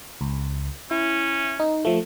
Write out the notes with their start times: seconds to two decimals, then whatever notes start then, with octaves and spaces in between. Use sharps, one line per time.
0.21 C#2
0.91 C#4 E4
1.60 D#4
1.85 F3 A3